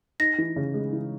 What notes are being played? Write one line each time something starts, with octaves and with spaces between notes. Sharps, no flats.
D#4 A#6
E3
C#3
G#3
E3